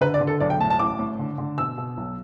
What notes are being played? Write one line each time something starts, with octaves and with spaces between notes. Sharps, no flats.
D3 B4
D5
D3
A4
B1 D5
G5
A2 A5
A5
A1 D6
A2
D3
D3
B2 E6
B2
B1